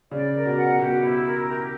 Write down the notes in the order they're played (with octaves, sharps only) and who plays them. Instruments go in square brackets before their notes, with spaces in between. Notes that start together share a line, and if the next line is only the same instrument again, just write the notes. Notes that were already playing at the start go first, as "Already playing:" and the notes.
[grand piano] C#3 [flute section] D5
[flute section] A#4
[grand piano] B2
[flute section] F#5
[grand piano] B2 [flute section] G4
[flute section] E4
A#4
G4